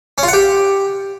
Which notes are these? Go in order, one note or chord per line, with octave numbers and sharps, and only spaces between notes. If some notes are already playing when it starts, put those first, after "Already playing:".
C#4
F4
F#5
G4